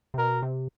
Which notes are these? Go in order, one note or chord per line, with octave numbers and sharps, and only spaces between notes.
C3
B2 A#4
C3